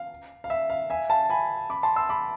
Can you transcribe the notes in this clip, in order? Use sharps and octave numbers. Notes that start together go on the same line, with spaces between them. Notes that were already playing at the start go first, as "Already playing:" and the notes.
Already playing: F5
F5
E5
F5
E5 G#5
F5 A5
G#5 B5
B5 D6
A5 C6
C6 E6
B5 D6